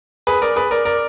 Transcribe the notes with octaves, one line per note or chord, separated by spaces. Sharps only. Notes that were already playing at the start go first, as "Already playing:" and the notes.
G#4 B4
A#4 D5
G#4 B4
A#4 D5
A#4 D5